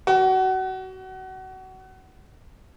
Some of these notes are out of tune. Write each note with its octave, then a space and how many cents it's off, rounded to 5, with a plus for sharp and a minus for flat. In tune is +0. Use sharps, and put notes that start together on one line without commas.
F#4 +25